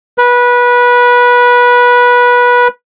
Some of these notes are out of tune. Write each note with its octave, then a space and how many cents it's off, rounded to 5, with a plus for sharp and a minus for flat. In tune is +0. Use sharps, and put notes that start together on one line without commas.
B4 -20